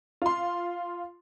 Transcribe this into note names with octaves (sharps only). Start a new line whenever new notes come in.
F4 C6